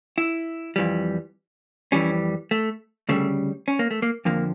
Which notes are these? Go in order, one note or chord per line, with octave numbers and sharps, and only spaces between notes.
E4
F2 E3 G3
F2 E3 G3 C#4
A3
D2 C#3 G3 A3
C#4
A#3
A3
A#3
F2 D3 F3 A#3